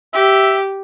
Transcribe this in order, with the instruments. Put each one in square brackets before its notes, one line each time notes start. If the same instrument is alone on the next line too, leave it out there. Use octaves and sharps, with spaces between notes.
[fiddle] G4 [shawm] E5